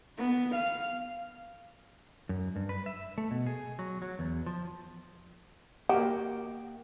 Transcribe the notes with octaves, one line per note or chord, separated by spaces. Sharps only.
B3
F5
F#2
G2
B4
E5
A3
B2
G#4
F#3
F#3
E2
F3
A#3 F#4 G4